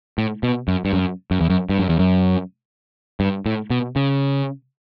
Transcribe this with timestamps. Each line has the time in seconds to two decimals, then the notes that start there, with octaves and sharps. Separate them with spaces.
0.18 A2
0.43 B2
0.68 F#2
0.85 G2
0.93 F#2
1.31 F#2
1.41 E2
1.50 F#2
1.69 G2
1.79 F#2
1.89 E2
1.99 F#2
3.20 G2
3.46 A2
3.70 B2
3.96 C#3